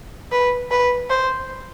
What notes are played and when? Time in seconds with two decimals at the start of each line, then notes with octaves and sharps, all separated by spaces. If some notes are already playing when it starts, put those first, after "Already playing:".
0.32 B4
0.71 B4
1.10 C5